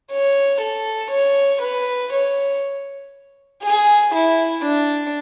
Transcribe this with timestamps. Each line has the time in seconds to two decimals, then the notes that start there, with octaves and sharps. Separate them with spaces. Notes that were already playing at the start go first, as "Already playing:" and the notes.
0.12 C#5
0.61 A4
1.11 C#5
1.62 B4
2.13 C#5
3.64 G#4
4.15 E4
4.65 D4